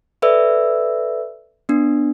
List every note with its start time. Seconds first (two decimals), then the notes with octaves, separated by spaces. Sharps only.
0.22 A4 B4 D5 E5 E6
1.69 B3 D4